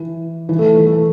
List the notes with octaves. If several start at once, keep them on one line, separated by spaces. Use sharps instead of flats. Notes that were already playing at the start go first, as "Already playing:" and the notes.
Already playing: E3
E3
A3
E3
A3